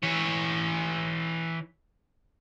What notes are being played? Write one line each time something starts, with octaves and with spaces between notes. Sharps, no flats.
E3 C#5